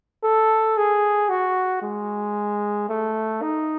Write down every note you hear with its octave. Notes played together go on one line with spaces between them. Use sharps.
A4
G#4
F#4
G#3
A3
D#4